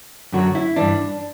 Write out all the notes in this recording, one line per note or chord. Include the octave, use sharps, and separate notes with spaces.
F#2 D3 F#3 F#4
E4
G2 E3 D4